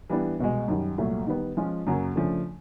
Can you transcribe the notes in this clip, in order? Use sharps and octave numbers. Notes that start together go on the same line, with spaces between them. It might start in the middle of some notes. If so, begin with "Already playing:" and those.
E3 G3 B3 D4
C2 B2 G#3
F#2 D#3 G3
C2 A#2 F#3 A3
D#3 G3 B3
F3 G#3 C#4 F4
F#2 C#3 F#3 A#3
C#3 F3 A3 D4